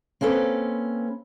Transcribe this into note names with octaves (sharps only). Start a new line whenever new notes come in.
A#3 C4 C#4 A4 B4